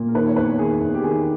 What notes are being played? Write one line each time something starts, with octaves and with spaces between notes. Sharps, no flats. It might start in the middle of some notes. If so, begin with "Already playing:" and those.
Already playing: A#2
A#4
D#3 B4
C#5
E2 B4
D#3 G#4
E2
G4
D#3 G#4